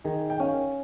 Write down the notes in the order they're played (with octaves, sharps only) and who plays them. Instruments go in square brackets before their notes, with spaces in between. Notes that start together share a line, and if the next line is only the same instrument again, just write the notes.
[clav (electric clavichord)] D#3 [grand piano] G#4
[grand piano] G5
[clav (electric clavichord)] C#4 [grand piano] F5